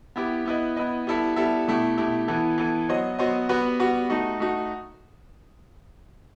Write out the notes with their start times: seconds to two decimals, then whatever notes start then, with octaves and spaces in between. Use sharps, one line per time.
0.16 B3 E4 G4
0.45 B3 E4 B4 D#5
0.77 B3 E4 B4 D#5
1.07 G3 B3 E4 A4 E5
1.36 G3 B3 E4 A4 E5
1.68 B2 A3 E4 G4
1.98 B2 A3 E4 G4
2.28 E3 B3 E4 A4
2.58 E3 B3 E4 A4
2.89 F#3 B3 F#4 C5 D#5
3.19 F#3 B3 F#4 C5 D#5
3.49 G3 B3 F#4 B4
3.80 G3 B3 F#4 B4
4.10 A3 D#4 F#4
4.40 A3 D#4 F#4